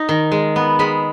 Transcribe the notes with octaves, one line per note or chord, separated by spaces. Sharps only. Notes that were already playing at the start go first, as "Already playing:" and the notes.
Already playing: D#4 A#5
D#3
G#3
B3
G#3 B5